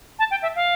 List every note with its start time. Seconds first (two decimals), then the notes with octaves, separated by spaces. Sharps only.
0.19 A5
0.31 G5
0.42 E5
0.56 F5